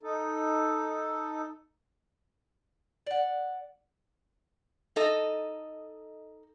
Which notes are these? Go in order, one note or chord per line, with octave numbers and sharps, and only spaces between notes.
D#4 A4
D5 F#5
D#4 A4 D#5